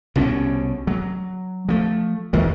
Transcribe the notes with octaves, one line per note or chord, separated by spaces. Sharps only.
C2 B2 D3 C#4
F#3
F3 A3
E2 D#3 E3